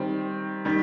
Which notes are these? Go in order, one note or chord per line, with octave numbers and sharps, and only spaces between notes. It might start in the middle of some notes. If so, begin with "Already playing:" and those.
Already playing: D#3 G3 C4
D#3 G3